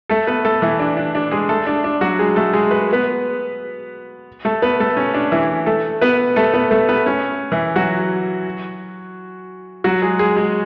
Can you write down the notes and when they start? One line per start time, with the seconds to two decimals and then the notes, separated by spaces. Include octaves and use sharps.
0.09 A3 A4
0.27 B3 B4
0.45 A3 A4
0.62 E3 E4
0.79 D4
0.97 D4
1.15 D4
1.31 G#3 G#4
1.49 A3 A4
1.67 D4
1.84 D4
2.01 F#3 F#4
2.19 G#3 G#4
2.36 A3 A4
2.53 G#3 G#4
2.71 B4
2.93 B3 B4
4.45 A3 A4
4.62 B3 B4
4.80 A3 A4
4.97 C#4
5.14 D4
5.32 E3 E4
5.66 A3 A4
6.01 B3 B4
6.36 A3 A4
6.54 B3 B4
6.71 A3 A4
6.89 B3 B4
7.06 C#4
7.52 E3 E4
7.76 F#3 F#4
9.84 F#3 F#4
10.02 G#3 G#4
10.19 G#3 G#4
10.37 G#3 G#4